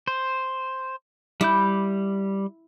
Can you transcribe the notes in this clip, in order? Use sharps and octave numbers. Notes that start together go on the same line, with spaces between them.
C5
G3 E4 D6 G6